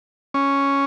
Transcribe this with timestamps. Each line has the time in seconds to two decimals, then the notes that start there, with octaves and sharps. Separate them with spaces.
0.34 C#4